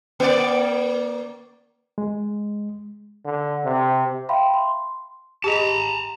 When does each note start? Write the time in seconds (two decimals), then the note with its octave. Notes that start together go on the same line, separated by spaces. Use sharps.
0.20 A#3 D5
1.98 G#3
3.25 D3
3.65 C3
4.29 E5 F5 G5 B5 C6
4.54 C6
5.44 G4 G#4 D#5 A5 A#5